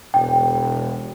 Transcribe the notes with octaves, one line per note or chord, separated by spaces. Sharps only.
E1 G5